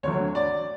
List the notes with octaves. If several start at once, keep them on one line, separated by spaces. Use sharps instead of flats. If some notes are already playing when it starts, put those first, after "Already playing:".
D2 D3 F#3 C#5
D5